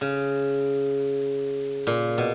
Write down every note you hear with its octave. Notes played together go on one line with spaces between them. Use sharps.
C#3
A#2
B2